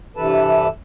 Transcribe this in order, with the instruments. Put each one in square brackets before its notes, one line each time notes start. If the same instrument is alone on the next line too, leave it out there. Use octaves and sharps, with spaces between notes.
[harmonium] G2 C3 E3 A4 B4 A5